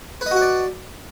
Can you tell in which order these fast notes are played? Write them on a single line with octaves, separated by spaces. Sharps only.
B4 D#5 F#4 F#5 D5